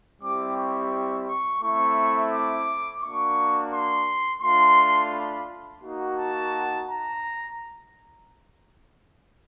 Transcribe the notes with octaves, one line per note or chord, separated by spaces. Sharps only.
G3 C4 E4 G4 D6
C#6
C#6
A3 C4 E4 C#6
D6
A#3 D4 F#4 C#6
C6
A3 D4 F4 C6
B5
A#3 D#4 F#4
A5
A#5